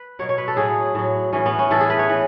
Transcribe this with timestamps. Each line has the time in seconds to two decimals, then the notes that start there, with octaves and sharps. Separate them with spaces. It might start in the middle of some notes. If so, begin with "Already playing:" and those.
Already playing: B4
0.19 B2 F#3 C#5
0.29 C#5
0.38 B4
0.48 A4
0.57 A2 F#3 G#4
0.95 A2 F#3
1.33 A2 E3 C#4
1.46 B3
1.59 C#4
1.71 A2 E3 A4
1.80 G#4
1.90 B4
1.99 C#5
2.09 E3